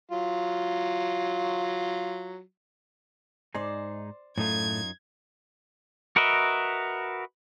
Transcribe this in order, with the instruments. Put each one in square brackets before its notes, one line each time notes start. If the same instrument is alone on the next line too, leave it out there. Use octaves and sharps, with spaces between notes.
[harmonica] F#3 F4
[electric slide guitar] G#2 D#4 G#4 [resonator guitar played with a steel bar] C5 D5
[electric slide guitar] F#2 D#4 F4 [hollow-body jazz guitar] A2 A3 [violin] G#6
[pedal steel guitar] F#4 A#4 B4 D#5 E5